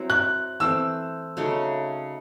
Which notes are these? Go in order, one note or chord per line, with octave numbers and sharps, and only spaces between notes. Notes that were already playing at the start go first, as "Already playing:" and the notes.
Already playing: F#3 C4 E4
F#6
E3 A3 C4 E6
C#3 F#3 A3 D#4